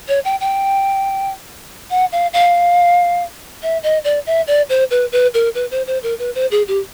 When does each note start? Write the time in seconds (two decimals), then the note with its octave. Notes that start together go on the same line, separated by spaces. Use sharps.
0.08 C#5
0.25 G5
0.40 G5
1.90 F#5
2.12 F5
2.33 F5
3.63 E5
3.83 D#5
4.04 D5
4.27 E5
4.47 D5
4.69 C5
4.91 B4
5.12 B4
5.34 A#4
5.55 B4
5.71 C5
5.87 C5
6.03 A#4
6.19 B4
6.35 C5
6.51 G#4
6.68 G4